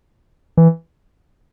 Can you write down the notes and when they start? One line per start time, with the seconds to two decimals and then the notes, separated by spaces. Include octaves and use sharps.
0.57 E3